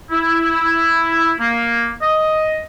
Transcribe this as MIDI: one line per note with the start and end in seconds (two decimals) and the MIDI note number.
0.11 1.35 64
1.40 1.93 58
2.02 2.63 75